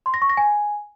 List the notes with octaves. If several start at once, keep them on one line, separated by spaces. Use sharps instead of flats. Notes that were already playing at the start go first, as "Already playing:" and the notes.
C6
A#6
C#6
A#6
G#5